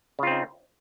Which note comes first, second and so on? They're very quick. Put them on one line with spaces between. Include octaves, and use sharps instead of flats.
C#3 F4 C4 D#4